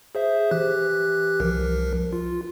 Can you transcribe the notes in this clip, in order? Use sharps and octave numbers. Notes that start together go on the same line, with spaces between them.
G#4 C5 E5
E3 G4 F#6
C2 F3 A#4
F4